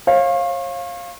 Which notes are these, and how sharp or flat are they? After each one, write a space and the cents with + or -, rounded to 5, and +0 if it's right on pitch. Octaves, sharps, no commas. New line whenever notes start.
C#5 -40 F5 +0